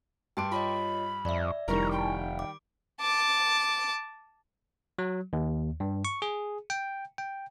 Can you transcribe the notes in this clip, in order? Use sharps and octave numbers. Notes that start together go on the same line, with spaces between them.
G2 G5 A5 C6 D6 D7
F4 C#5 D#5 B5
F2 D5 E5
F1 D#3 G3 E4 A#4 A#5 C#6
G5
D6
A5 D6
F#3
D#2
G2
C#6
G#4
G5
G5